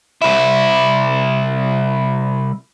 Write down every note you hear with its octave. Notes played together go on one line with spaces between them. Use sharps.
C2 E4